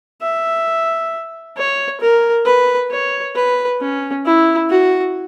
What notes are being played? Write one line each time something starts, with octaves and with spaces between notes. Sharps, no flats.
E5
C#5
A#4
B4
C#5
B4
C#4
E4
F#4